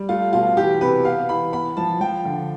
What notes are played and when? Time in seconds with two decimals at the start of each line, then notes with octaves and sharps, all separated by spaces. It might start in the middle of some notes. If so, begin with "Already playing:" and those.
Already playing: G3
0.09 A3 F4
0.33 B2 F4
0.57 E3 G4
0.81 C3 B4
1.05 B3 F5
1.29 E3 B5
1.53 B3 B5
1.77 F3 A5
2.01 F3 G5
2.25 D3